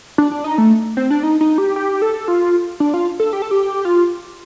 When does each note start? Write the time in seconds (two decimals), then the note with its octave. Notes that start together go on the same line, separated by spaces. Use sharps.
0.18 D4
0.31 D4
0.44 D#4
0.58 A3
0.97 C4
1.10 D4
1.23 D#4
1.41 D#4
1.58 G4
1.76 G4
2.02 A4
2.28 F4
2.80 D4
2.94 F4
3.20 A4
3.33 G4
3.42 A4
3.51 G4
3.85 F4